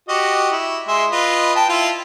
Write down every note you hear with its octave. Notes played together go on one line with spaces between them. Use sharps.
F#4 G4 D#5
E4
G#3 E5 C6
F4 B4 D#5
G5 A5
E4 F4